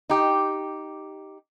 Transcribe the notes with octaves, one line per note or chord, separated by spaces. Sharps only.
D#4 G4